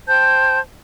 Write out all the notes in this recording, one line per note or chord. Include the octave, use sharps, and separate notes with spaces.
C5 G5 A5 G6